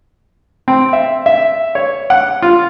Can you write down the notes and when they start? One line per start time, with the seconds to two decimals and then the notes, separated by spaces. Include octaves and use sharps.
0.68 C4
0.93 E5
1.26 E5
1.75 C#5
2.10 F#5
2.42 F4